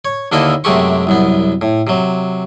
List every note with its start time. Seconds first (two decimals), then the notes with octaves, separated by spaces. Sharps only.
0.05 C#5
0.32 D#2 D3 A#3 E4 A4 D#5
0.64 F#2 C3 G#3 A3 G4 C#6
1.07 C2 F#2 B3
1.61 A2
1.87 C3 F#3